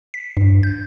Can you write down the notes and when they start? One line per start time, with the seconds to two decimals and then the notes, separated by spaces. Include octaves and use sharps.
0.14 B6
0.37 G2
0.63 G6